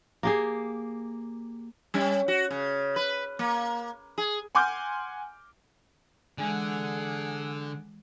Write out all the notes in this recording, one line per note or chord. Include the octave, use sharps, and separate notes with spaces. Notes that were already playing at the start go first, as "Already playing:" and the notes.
A#3 G4 G#4
G3 C#4
F#4
C#3
B4
A#3
G#4
F#5 G#5 C6 D6 F6 G6
D3 E3 G#3 G#4 F#5 G#5